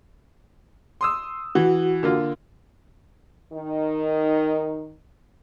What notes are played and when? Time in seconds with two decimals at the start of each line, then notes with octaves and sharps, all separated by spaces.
1.01 C6 D#6 E6
1.55 E3 F#4
2.03 D3 A#3 F4
3.52 D#3 D#4